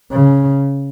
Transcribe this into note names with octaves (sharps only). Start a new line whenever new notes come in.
C#3